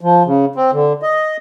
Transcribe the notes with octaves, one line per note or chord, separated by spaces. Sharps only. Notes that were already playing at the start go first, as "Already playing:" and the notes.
F3
C#3
C4
D3
D#5